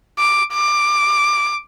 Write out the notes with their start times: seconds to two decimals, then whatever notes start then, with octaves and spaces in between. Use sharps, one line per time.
0.19 D6
0.53 D6